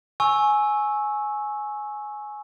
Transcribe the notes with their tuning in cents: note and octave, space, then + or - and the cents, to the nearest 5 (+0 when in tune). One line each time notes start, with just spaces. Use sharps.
G#5 +15 C#6 -10 E6 -10